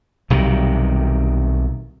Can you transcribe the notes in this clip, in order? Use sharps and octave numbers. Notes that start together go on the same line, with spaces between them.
B1 C3 D#3 G3